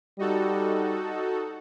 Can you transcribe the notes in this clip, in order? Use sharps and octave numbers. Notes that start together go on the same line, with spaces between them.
G3 D#4 F#4 A4